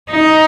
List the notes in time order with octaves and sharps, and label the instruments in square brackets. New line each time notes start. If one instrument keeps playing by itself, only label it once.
[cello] D#4